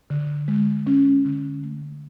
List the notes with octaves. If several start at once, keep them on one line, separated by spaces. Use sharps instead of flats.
D3
G#3
C#4
D3
A3